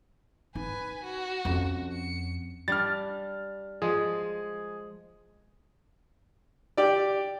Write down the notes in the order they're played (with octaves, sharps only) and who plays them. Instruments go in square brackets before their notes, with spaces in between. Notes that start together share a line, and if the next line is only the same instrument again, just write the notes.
[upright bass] D#4 [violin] B4 G#5
[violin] F#4
[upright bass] F2 C#4
[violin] C#7
[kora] G3 D4 [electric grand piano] F6 A6
[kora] F3 G#3 [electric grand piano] G#4
[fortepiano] G4 D5